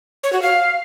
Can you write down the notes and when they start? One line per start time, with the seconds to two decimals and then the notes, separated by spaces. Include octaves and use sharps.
0.23 C#5
0.33 F#4
0.42 F5